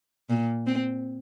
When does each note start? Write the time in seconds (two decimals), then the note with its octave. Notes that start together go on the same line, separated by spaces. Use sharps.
0.30 A#2
0.67 C4